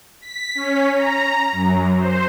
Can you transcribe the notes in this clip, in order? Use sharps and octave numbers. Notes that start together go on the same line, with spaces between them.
B6
C#4
A#5
F#2
C5